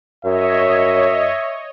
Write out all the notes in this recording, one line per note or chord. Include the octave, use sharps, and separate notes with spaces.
F#2 C#5 D#5 E5